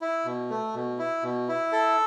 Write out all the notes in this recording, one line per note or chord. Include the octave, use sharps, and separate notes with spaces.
E4
B2
A3
B2
E4
B2
E4
A4